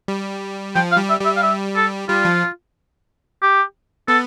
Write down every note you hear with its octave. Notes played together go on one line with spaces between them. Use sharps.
G3
F3 G5
F5
G3
E5
G3
E5
F5
E5
A4
G3 F4
F3
G4
B3 A4